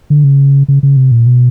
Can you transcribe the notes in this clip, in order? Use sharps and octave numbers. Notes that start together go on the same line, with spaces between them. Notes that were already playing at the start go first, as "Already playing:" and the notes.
D3
C#3
C#3
C#3
C3
A#2
B2